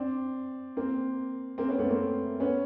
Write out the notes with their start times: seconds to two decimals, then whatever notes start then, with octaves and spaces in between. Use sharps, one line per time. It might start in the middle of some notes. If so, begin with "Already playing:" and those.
Already playing: C4 D4
0.77 A#3 C4
1.58 A#3 C4
1.68 B3 C#4
1.79 A3 B3
1.89 A#3 C4
2.40 B3 C#4